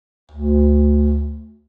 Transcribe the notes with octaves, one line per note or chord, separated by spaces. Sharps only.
D2